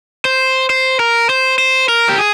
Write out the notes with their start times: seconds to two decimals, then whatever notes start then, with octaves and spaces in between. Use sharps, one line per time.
0.25 C5
0.70 C5
1.00 A#4
1.29 C5
1.58 C5
1.89 A#4
2.09 G4
2.18 G#4